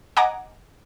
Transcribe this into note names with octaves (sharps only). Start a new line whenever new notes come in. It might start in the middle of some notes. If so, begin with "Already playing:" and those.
D#5 F#5 G#5 A#5 D6